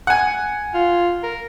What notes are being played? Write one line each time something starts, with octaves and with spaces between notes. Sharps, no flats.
F#5 G#5
F4
A#4